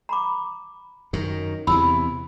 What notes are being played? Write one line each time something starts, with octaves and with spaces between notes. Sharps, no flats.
A#5 B5 D6
F#2 D#3
E2 C3 E3 B5 E6